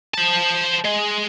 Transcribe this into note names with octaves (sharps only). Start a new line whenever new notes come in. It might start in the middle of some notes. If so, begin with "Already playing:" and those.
C5 A5
G#3